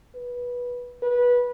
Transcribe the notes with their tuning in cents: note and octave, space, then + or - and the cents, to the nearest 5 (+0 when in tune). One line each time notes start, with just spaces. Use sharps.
B4 -15
B4 -20